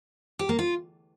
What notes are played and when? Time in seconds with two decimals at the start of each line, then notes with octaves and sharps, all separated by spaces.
0.39 G4
0.49 A#3
0.59 F4